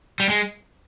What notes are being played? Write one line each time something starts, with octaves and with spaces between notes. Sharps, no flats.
G3
G#3